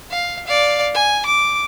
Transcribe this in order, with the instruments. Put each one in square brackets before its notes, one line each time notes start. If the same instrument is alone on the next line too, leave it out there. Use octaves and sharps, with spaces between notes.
[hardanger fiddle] F5
D5 F5
G#5
D6